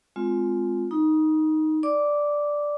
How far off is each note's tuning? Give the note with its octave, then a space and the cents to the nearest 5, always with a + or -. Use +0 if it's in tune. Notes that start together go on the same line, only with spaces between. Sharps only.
G#3 +10 C4 -10 F4 +0
D#4 +0 A#5 +45
D5 +0 D6 -10